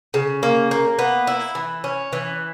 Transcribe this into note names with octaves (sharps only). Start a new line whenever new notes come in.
C#3
A#3
A#3
B3
E4
E3
C#4
E3